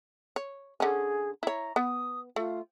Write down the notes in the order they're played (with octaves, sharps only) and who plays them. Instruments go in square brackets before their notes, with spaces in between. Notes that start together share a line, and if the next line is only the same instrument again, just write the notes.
[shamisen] C#5
[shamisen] D3 C#4 [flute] G#4
[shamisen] E4 C#5 [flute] A#5
[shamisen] B3 [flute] D#6
[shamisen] A3 [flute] F4